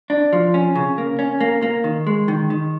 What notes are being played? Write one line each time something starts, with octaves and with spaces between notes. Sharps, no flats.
D4
F3
C#4
C#3
A#3
C#4
A#3
A#3
D#3
G#3
D#3
D#3